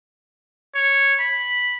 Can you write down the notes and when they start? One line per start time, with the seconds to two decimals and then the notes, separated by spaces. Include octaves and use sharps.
0.75 C#5
1.20 B5